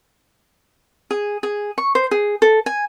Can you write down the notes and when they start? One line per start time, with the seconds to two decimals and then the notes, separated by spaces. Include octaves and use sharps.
1.11 G#4
1.43 G#4
1.78 C#6
1.95 C5
2.11 G#4
2.42 A4
2.66 G#5